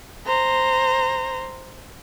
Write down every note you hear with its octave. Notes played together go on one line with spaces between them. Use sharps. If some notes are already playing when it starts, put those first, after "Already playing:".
C5 A#5